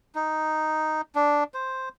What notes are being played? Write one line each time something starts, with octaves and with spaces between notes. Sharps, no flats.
D#4
D4
C5